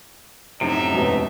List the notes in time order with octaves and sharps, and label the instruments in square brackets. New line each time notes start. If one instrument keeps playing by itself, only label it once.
[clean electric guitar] F#2 A2 C3 [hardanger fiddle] D#4 E5
[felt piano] E1 B2